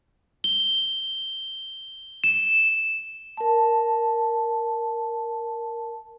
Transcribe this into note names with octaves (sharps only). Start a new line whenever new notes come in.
G7
E7
A#4 A5